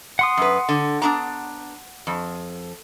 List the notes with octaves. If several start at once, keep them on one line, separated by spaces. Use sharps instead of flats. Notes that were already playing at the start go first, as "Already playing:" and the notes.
F#5 C6 D#6
F#2 B4
D3
B3 D4 A#5
F2